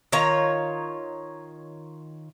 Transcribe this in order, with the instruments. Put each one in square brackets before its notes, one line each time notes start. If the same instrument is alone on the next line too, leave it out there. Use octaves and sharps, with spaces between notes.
[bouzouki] D#3 F4 C#5 A#5